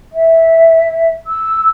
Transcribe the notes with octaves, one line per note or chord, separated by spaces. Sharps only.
E5
E6